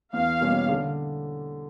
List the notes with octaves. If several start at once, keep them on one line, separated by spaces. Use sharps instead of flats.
E2 F5
B2 G3 A#3 C#4
D3